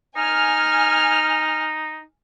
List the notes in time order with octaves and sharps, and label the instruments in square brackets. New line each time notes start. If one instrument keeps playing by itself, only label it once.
[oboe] D#4 [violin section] G#5 F6